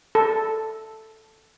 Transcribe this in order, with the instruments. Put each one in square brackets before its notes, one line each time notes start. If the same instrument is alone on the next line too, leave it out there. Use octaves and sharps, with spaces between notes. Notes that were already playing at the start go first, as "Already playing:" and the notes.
[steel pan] A4